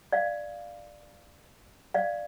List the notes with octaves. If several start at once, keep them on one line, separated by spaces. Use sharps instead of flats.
D5 F5
D5 F5